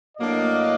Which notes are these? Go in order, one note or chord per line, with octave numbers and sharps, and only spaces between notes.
A2 F#3 A#3 D4 D#5